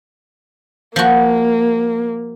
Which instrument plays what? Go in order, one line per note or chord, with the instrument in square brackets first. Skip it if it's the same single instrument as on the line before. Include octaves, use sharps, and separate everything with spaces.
[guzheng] F3 F#4 [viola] A#3